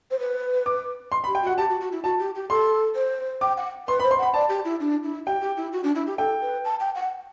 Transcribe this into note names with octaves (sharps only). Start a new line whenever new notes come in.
C5
B4
D6
C6
B5
G4
G5
F#4 F#5
G4 A5
F#4
F#4
E4
F#4 A5
G4
G4
A4 C6
C5
G5 D6
F#5
B4 C6
B5
C5
C6
F#5 B5
D5 A5
G4
E4
D4
E4
G4 G5
G4
E4
F#4
D4
E4
G4
A4 G5
B4
A5
G5
F#5